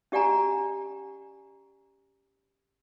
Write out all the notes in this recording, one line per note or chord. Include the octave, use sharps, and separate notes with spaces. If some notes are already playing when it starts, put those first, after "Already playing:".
C#4 G4 D5 F#5 G#5 A#5